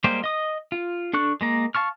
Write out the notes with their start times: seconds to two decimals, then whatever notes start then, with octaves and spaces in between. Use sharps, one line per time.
0.04 G3 G#3 A#3 G4 C5
0.24 D#5 D#6
0.72 F4
1.13 D4 A4 C#6 F#6
1.41 G#3 A#3 A#5
1.75 F5 A5 C#6 F6